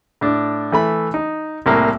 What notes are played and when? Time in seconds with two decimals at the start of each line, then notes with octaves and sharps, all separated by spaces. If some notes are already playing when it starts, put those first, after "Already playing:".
0.21 A2 D4
0.72 E3 A3 B5
1.14 D#4
1.66 C2 A2 A#3